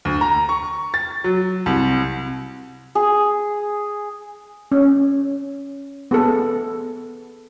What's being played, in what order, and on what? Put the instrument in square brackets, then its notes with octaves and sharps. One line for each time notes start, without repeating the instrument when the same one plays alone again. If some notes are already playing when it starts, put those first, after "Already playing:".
[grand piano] D2
A#5
C#6
A6
F#3
C2
[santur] G#4
[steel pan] C#4
B3 G#4 A4